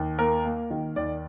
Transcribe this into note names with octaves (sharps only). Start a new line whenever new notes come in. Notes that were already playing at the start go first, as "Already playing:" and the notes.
Already playing: D#2
A#3 A#4
A#3
D#3
D#2 D5